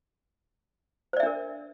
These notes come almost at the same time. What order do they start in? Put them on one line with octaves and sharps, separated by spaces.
C5 D5 E5 D4 A#4